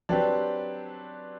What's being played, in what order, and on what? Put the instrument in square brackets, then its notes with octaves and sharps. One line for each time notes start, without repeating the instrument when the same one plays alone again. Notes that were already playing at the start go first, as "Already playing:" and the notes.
[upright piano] F#3 C4 G4 B4 [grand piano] D4